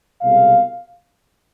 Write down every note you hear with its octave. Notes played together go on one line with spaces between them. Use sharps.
C2 B2 G#3 F5